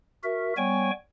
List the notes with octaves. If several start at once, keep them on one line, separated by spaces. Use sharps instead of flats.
F#4 A#4 E5
G3 B3 C#5 G5 G#5 C#6